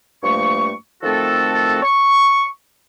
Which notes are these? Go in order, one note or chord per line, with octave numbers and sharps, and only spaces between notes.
G2 F3 A3 A#3 C#6
D#3 F3 A3 C4 F#4 A4
C#6